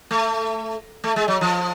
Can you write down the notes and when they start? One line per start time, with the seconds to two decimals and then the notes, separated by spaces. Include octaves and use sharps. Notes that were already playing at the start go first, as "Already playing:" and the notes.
0.11 A3
1.04 A3
1.16 G#3
1.28 F#3
1.41 F3